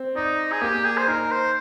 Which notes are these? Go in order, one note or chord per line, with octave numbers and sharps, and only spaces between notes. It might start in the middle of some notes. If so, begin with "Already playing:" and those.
Already playing: C4
D#4 D5
G#4
A#3 G4
G#4
C5
D#4 A#4
C5